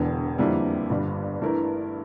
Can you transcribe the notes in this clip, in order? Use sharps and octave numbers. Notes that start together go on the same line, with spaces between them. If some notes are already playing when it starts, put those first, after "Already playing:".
Already playing: E1 E2 D3
F2 D3 G3 A#3 E4
G1 G2 D3 G3
G2 E3 A3 E4 A#4